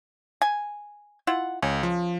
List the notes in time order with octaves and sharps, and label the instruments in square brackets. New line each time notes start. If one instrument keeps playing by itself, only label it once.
[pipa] G#5
E4 F4 F#5
[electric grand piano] C#2 [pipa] C#4
[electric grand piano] F3